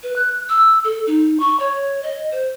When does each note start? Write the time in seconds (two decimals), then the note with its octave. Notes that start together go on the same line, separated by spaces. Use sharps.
0.03 B4
0.16 F#6
0.49 E6
0.84 A4
1.07 D#4
1.40 C#6
1.60 C#5
2.03 D#5
2.32 C5